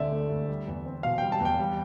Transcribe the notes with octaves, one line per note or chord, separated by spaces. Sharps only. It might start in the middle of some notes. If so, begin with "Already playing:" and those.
Already playing: D2 D3 A3 C4 D5 E5
A3
D2
G3
E2
C4
B2 F5
G3 G5
A5
E2
G5
G3